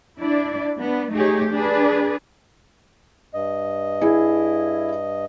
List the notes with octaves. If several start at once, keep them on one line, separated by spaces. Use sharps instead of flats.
D4 E4 D5
B3 D4
A3 D#4 G4 G#4 C#5
D4 G#4 B4 D5
G2 D#5
E4 G#4